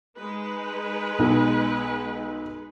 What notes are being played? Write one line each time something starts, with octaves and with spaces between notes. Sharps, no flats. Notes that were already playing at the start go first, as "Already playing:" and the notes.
G#3 D#4 B4
B1